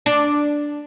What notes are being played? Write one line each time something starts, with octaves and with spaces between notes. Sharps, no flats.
D4